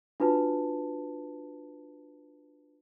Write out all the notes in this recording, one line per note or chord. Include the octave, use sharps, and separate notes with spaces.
D4 F4 F#4 B4 A5